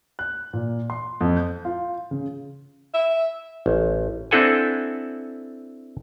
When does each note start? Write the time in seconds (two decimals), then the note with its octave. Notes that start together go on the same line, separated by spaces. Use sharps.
0.19 F#6
0.53 A#2
0.90 C6
1.21 F2
1.37 G6
1.65 F4
2.11 C#3
2.94 E5
3.66 A1
4.31 C4 D4 E4 A4 F#5 G#5